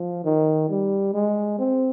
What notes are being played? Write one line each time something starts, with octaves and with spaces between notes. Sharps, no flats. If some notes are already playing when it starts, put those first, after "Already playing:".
Already playing: F3
D#3
G3
G#3
C4